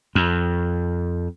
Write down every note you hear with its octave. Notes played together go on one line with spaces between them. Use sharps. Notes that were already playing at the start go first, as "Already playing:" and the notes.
F2